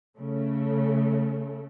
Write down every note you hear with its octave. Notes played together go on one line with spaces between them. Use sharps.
C#3 A3